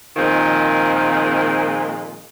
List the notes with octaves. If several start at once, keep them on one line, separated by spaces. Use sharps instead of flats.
A#2 D#3 F3 G#3 C4